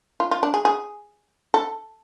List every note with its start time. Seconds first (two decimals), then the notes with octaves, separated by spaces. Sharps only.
0.20 F4
0.31 F4
0.43 D4
0.54 G#4
0.65 G#4
1.54 A4